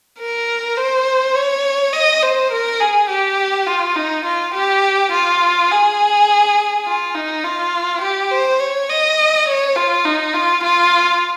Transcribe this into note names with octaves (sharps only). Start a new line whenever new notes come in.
A#4
C5
C#5
D#5
C5
A#4
G#4
G4
F4
D#4
F4
G4
F4
G#4
F4
D#4
F4
G4
C5
C#5
D#5
C#5
F4
D#4
F4
F4